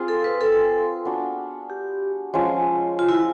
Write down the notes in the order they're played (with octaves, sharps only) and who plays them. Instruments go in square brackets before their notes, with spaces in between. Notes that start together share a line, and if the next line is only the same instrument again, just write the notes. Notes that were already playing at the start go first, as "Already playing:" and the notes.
Already playing: [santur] C4 F4 G#4
[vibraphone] A4
B4
A4
[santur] B3 D4 F#4
[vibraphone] G4
[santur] F3 G#3 C#4
[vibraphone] F4
E4